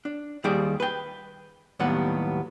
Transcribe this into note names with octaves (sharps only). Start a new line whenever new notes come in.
D4
D#2 G3 G#4 C5 D5
B4 G5
D#2 A2 F#3 G3 B3 F#5